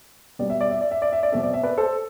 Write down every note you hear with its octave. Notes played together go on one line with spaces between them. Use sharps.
B2 G3 B3 D5
E5
D5
E5
D5
E5
D5
E5
D5
B2 A3 C4 E5
D5
E5
B4 D5
A4 C5